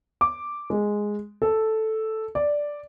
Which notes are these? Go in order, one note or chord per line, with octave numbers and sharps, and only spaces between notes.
D6
G#3
A4
D5